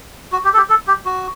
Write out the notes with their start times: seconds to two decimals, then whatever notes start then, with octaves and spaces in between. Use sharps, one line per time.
0.32 F#4
0.44 G4
0.53 A4
0.57 G4
0.69 A4
0.88 G4
1.06 F#4